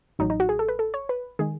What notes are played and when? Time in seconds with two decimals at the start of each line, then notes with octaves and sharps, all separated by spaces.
0.19 A1 A2 F#3 D#4
0.30 D#4
0.40 F#4
0.49 G#4
0.59 A4
0.68 B4
0.79 A4
0.94 C#5
1.09 B4
1.39 D#3 G#3 G#4